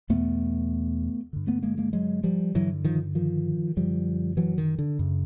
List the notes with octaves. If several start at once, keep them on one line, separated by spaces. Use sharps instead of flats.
E2 B2 A3 B3
G2 D3
A3 B3
G#3 A#3
G#3 A#3
F#3 G#3
F3 G3
G2 D3 E3 F#3
D#3 F3
D#3 F3
F#2 D3 F3 G3
E3 F#3
D#3
D3
F#2 C#3